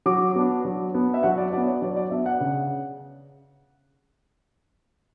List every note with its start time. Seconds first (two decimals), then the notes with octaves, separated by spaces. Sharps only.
0.06 F#3 D6
0.36 B3 D4
0.65 F#3
0.94 B3 D4
1.14 E5
1.23 F#3 F#5
1.38 D5
1.53 D4 D5
1.57 B3
1.67 C#5
1.82 F#3 D5
1.96 D5
2.11 B3 D4 E5
2.26 F#5
2.40 C#3